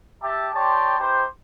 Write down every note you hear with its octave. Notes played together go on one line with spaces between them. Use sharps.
G4 E5 A5
G4 C#5 D5 G5 A5 C6
D#4 G4 B4 C5